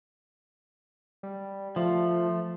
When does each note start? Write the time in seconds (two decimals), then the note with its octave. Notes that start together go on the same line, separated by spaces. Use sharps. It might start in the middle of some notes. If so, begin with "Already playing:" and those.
1.23 G3
1.76 F3 A3